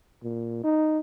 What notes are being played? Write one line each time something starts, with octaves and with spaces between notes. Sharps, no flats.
A#2
D#4